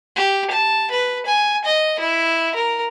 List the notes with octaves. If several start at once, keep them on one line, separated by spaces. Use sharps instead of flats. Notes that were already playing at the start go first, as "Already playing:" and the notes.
G4
A5
B4
G#5
D#5
E4
A#4